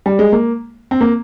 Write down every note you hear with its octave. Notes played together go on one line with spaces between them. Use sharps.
G3
G#3
A#3
C4
A#3